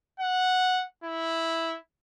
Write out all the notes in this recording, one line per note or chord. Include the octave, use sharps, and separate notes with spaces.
F#5
E4